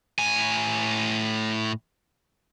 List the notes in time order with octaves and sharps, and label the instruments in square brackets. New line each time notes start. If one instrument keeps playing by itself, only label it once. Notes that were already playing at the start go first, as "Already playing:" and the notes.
[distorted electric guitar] A2 G#5